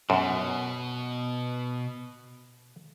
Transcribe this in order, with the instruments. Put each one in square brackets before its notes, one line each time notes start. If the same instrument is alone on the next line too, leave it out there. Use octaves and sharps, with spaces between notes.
[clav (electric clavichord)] F#2 [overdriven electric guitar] B2